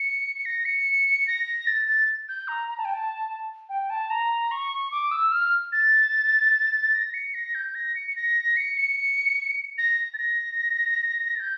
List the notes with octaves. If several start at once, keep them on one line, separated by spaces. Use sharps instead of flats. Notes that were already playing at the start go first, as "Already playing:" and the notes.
Already playing: C#7
C#7
A#6
C#7
A#6
A6
A6
G6
A#5
A#5
A5
G5
A5
G5
A5
A#5
C#6
D6
E6
F6
A6
A#6
C#7
A#6
G6
A#6
C#7
C#7
A#6
C#7
C#7
A#6
A6
A#6
A6
G6